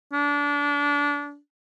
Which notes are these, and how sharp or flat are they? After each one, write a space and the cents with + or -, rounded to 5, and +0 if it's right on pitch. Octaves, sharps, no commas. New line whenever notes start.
D4 -25